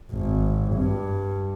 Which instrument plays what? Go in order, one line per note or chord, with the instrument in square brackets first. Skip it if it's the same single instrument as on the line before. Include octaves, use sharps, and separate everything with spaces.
[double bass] G#1
G2